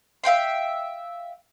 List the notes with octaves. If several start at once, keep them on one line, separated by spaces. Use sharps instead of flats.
E5 F5 G5 C6